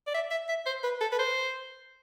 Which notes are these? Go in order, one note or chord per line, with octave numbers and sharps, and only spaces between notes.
D5
E5
E5
E5
C5
B4
A4
B4
C5